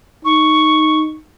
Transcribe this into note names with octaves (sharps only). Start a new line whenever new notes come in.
D#4 C#6